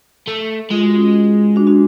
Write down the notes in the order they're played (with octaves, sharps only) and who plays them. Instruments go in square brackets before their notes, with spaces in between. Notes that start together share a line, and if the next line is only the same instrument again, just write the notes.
[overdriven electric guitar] A3
[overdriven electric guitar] G#3 [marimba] F4
[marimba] F#4
C#4 F4
D4 F#4
D4 F#4